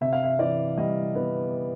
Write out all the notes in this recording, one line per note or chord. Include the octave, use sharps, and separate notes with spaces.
C3 E5
F5
E5
E3 D5
G3 D#5
B3